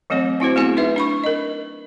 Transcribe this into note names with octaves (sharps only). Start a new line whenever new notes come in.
E3 F#3 A3 C4 C#5
C4 E4 F#4 C5
A3 B3 C4 E4 G#4
D#4 B4 E5
D4 B5 C#6
A#4 D#5